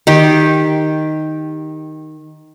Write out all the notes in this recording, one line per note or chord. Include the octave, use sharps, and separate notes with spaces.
D#3 G4